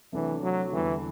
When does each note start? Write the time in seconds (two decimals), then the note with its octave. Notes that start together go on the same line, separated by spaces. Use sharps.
0.12 C2 C3 E3 F#3 A3 D4
0.42 F#3
0.72 E2 D3 E3 G3 B3 D4